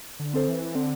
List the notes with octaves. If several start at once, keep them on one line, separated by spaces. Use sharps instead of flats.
D3
C4 A4 C5
E3
D3 C4